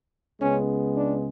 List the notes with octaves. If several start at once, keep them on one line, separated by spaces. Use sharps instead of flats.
C#2 C#3 G#3 B3 C#4
D4